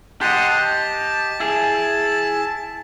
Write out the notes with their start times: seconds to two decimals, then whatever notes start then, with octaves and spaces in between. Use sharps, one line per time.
0.21 G4 D#5 F#5 A5 C6
0.50 A5
1.40 E4 G#4